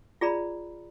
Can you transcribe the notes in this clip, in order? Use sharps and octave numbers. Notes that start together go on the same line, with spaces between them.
F4 G#4 D5 A#5 B5